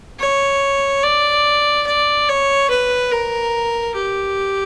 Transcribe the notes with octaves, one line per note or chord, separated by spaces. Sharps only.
C#5
D5
D5
C#5
B4
A#4
G4